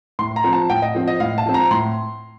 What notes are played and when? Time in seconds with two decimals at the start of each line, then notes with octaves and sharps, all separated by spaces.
0.19 A2 C6
0.36 A#5
0.44 F3 C4
0.53 A5
0.70 A2 G5
0.82 D#5
0.95 F3 C4
1.08 D#5
1.20 A2 F5
1.38 A5
1.46 F3 C4
1.54 A#5
1.71 A2 C6